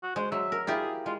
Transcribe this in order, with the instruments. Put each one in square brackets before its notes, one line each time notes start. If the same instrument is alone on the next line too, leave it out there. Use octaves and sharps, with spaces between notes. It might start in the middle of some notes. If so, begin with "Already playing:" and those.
[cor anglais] F#4
[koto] G#3 [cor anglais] C5
[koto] F#3 [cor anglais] E5
[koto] A#4
[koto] E4 F4 G4 [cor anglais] G#4
[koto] G#3 [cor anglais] F4